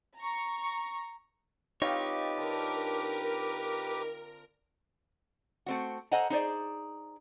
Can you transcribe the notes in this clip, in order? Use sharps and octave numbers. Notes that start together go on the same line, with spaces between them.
A#5 C#6
C4 D#4 F4 G4 B4 C#5 D#5 D6
D3 A#4
A3 C4 F#4
A4 C5 D#5 F#5 G#5 A#5
D#4 G#4 C5 D5